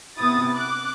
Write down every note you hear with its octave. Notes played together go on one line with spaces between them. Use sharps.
C3 B3 E4 D#6 A6
D6 F#6